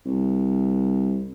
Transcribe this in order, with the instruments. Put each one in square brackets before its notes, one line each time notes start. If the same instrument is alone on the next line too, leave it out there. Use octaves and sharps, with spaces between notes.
[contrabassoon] C2